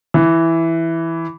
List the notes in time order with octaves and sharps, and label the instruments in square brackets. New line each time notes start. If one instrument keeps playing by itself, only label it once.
[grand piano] E3